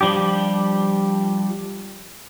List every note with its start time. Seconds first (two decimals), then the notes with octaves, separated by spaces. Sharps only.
0.01 F3 G3 D4 G4